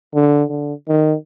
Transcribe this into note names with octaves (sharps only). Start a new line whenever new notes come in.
D3
D3
D#3